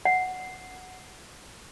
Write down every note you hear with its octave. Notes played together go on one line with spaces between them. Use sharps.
F#5